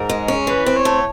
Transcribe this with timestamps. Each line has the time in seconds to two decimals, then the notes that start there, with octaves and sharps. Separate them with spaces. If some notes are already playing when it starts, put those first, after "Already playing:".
Already playing: G#2 A#4
0.09 G#3
0.28 C#4
0.47 E3 B4
0.66 C4
0.76 C#5
0.85 A3